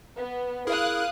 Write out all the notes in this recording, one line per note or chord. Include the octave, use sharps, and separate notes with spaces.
B3
E4 G#4 A#4 F5 D#6 F#6